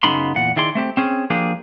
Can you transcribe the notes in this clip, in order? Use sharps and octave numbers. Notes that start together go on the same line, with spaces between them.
F#2 C#3 B3 D#4 B5 C6
E2 A#2 F#5
D#3 E4 G#4 D5 C6
A3 C4 G4
C4 C#4 G#4
F3 A#3 D4 G4 G#4